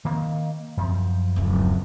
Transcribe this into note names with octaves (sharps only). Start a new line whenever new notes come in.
D#3 A#3 C4
F#2 F3 C4
D1 C#2